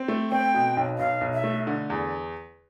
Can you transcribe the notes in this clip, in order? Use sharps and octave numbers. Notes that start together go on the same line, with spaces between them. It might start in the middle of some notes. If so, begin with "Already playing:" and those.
Already playing: C4
A3
C4 G5
B2
B1
B1 F5
B1
E5
A3
D3
E2